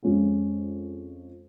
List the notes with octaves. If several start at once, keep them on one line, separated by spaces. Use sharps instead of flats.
F2 F3 G#3 C#4 F4